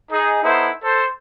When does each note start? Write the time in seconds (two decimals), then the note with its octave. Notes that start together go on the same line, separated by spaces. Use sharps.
0.11 D#4 G#4
0.42 B3 D#4 E4 A4 C5
0.83 A4 C5